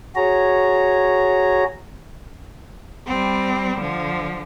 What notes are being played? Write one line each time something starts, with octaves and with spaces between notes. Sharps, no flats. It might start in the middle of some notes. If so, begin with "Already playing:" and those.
F#4 G#4 C#5 A#5
G3 C4
D3 F3